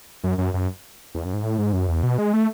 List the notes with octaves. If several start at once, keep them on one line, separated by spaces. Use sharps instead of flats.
F#2
F#2
F#2
E2
F#2
G#2
A2
G#2
F#2
E2
B2
G#3
A3